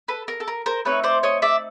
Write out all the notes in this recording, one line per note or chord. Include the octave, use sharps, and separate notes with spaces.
A4 B4
A#4
A4
A#4
A#4 C5
A3 C4 D#4 B4 C#5
C5 D5
C#5 D#5
D5 E5